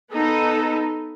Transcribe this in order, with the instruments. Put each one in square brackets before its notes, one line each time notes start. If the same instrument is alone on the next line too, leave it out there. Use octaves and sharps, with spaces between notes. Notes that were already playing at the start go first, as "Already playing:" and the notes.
[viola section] B3 D#4 A4